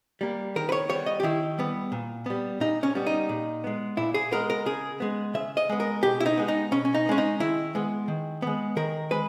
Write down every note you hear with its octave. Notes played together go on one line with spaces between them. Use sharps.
G3 A#3
D#3 A#4
B4
C#5
G3 B3 C#5
D#5
G4
D#3 E4
G3 B3
A#2
G3 B3
A#2 D#4
C#4
G3 B3
D#4
A#2
G#3 B3
A#2 E4
G#4
G#3 B3 A#4
A#4
C#3 G#4
G#3 B3
C#3 E5
D#5
G#3 B3
A#4
B2 G4
E4
D#4
G#3 B3
D#4
B2 C#4
C#4
D#4
B3
G#3 C#4
D#4
D#3 E4
G#3 B3
D#3
G#3 B3
D#3 A#4
G#3 B4